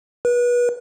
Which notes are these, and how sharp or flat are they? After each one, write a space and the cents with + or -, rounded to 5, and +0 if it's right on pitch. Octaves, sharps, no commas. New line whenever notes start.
B4 -30